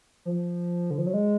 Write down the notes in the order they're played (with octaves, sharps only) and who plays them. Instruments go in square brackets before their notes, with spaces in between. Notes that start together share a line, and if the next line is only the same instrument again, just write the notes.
[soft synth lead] F3
D3
F3
F#3
G#3